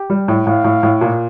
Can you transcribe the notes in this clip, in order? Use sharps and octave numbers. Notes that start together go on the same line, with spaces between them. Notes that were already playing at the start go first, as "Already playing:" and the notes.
Already playing: G4
G3
A2
A2 F5
A2
A2
A#2